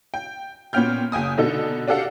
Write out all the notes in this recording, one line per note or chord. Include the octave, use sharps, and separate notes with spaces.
G5
A#2 B3 C#4 G5 F6 G6
F#1 G5 G#5 D#6
B2 D3 D#4 A4
D4 F#4 G4 A4 F5 F#5